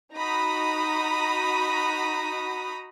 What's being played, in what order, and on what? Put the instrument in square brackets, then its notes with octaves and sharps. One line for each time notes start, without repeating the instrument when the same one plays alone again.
[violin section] D#4 F#4 A#5 B5 D#6